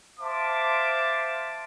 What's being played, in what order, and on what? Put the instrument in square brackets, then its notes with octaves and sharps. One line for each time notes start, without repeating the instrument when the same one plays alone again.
[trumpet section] C5 E5 F5 A5 C6 D6